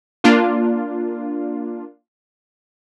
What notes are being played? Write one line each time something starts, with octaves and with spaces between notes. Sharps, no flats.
A#3 D4 F4